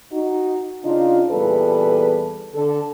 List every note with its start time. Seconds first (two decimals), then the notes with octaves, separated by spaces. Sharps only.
0.12 D#4 F#4
0.85 C#3 D4 D#4 F4
1.31 E2 A#2 G3 G#4 A4 B4
2.55 D3 A4